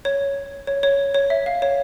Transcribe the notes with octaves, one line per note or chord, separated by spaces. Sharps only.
C#5
C#5
C#5
C#5
E5
F5
C#5